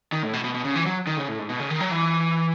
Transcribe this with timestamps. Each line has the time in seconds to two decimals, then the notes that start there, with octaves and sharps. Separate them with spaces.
0.12 D#3
0.23 A2
0.33 B2
0.44 B2
0.54 B2
0.65 C#3
0.75 E3
0.86 F#3
1.07 D#3
1.17 C#3
1.28 A2
1.39 G#2
1.49 B2
1.60 C#3
1.70 D#3
1.80 F#3
1.91 E3